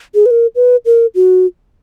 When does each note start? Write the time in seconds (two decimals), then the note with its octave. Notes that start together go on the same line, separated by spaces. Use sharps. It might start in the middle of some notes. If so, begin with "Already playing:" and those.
0.15 G#4
0.26 B4
0.31 A#4
0.56 B4
0.85 A#4
1.15 F#4